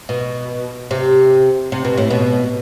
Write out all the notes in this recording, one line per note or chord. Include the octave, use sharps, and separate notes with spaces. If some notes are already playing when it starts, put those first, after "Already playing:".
B2
C3
C3
B2
A2
B2